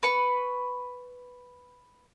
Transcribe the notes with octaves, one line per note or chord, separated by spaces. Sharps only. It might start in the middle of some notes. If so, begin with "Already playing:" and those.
B4 C#6